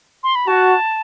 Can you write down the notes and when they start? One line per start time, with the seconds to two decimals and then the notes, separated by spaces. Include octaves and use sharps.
0.24 C6
0.35 B5
0.47 F#4 A5